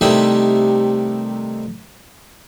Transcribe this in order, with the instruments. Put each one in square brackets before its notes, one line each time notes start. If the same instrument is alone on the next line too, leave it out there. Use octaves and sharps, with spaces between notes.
[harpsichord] C3 D#3 G3 A3 E4 G4